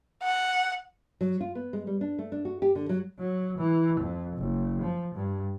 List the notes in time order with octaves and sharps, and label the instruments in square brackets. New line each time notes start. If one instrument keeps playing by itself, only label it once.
[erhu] F#5
[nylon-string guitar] F#3
F4
B3
G#3
G3
D4
A3
D4
F#4
G4
D3
F#3
[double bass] F#3
E3
F2
F#1
F3
G2